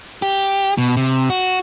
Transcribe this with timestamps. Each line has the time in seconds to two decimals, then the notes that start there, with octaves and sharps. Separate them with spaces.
0.22 G4
0.78 B2
0.97 C3
1.30 F#4